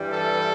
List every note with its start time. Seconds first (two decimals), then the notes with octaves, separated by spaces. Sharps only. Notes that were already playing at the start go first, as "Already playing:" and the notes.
Already playing: G2 E3 G3
0.13 A4